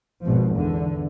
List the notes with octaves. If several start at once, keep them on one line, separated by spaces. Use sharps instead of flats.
G#1 B2 F3
E2 D3